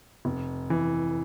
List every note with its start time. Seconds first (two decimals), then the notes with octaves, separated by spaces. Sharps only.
0.25 F1
0.70 E3